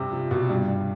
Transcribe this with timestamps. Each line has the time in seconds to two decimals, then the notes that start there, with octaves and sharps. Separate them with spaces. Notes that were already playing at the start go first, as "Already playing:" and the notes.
Already playing: G2 C3
0.12 F3
0.31 B2
0.49 G2
0.68 G2